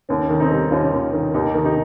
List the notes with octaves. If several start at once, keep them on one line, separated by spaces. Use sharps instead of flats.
D#2 C#4
D#3
C4 D#4
G3
D#2 C#4 F4
D#2
D#3
D#2 D#4 G4
D#3
D#4 G4